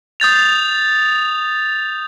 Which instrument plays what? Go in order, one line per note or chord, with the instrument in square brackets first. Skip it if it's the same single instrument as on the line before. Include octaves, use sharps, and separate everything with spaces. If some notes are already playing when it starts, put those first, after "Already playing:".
[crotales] D#6 G6 A6 F7